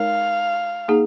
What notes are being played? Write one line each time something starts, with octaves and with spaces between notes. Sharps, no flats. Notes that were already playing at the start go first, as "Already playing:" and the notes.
Already playing: G#3 D#4 A#4 C#5 F5
A#3 D#4 G#4